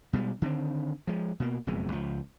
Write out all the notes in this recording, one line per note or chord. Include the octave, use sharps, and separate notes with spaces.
B2 G3 G#3
D3 D#3 G3 C4
F3 G#3
B2 A#3
F#1 F2 B2 G#3
C#2 F3